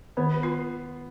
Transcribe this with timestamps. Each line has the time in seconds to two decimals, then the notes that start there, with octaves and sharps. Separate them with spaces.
0.17 D#3 B3
0.43 F4